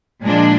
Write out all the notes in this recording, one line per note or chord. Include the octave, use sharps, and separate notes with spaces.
A#2 F3 G#3 D4